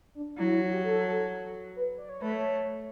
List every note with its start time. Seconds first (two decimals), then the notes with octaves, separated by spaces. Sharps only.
0.15 D4
0.38 F#3 E4
0.50 E4
0.60 F#4
0.72 G4
0.84 A4
1.76 B4
1.98 D5
2.09 C#5
2.21 A3 B4
2.33 C#5